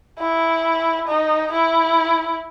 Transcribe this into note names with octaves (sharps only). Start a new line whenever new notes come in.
E4
D#4
E4